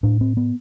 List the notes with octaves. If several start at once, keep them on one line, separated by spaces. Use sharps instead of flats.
A2 D4
C4
B3